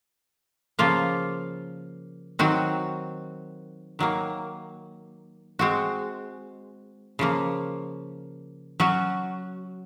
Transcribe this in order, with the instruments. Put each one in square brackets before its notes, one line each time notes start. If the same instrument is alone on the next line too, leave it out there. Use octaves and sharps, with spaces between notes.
[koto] C#3 F3 A#3 F4
D#3 F#3 C4 F#4
D#3 F#3 A#3
G#3 C4 F#4
C#3 F3 A#3
F#3 C#4 F#4